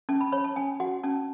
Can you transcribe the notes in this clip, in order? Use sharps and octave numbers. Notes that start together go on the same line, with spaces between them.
C#4 A5
B5
C#5 B5
A5
C#4 G#5
F#4 F#5
C#4 A5